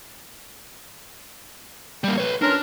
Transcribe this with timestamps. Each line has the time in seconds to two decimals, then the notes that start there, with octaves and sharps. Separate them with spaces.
2.04 G3 A#3
2.18 B4 C#5
2.42 C#4 D4 F4 A#4